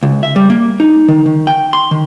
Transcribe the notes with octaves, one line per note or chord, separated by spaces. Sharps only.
C#2
E5
G3
A#3
D#4
D#3
D#3
G5
C6
D#3